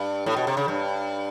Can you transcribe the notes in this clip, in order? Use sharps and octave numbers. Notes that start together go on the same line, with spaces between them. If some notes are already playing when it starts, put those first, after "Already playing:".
Already playing: G2
A2
B2
C3
C#3
G2